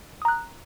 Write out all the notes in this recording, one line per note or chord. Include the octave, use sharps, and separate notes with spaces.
A#5 D#6 F#6